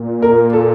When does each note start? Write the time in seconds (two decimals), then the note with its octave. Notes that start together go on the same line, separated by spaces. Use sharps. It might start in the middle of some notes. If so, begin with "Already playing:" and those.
Already playing: A#2
0.22 A#4
0.53 A4